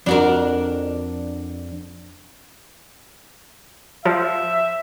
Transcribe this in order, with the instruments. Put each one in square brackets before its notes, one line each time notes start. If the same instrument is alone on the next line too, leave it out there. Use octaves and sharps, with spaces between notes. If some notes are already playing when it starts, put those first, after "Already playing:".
[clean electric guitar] F2 [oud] D4 F#4 A#4
[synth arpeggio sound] F3 [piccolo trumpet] E5